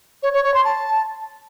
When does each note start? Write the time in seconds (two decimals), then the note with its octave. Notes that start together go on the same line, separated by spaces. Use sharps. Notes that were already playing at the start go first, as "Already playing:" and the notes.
0.23 C#5
0.33 C#5
0.44 C#5
0.54 C6
0.65 A5